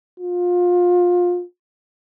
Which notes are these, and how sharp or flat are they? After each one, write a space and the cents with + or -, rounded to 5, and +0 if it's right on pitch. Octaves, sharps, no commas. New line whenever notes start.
F4 +25